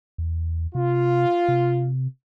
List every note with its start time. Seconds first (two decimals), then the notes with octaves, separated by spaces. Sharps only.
0.18 E2
0.75 C3 F4
1.48 C3